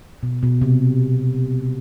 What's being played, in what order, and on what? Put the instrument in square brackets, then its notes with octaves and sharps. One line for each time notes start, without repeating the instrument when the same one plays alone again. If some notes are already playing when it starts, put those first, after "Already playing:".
[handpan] B2
B2
C3